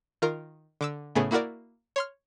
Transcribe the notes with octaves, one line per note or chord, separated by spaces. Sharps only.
D#3 F4 A#4
D3 D6 E6
A2 C#3 A3 B3 G#4
A#3 E4 F#4 A#4 D5
C#5 C6 F6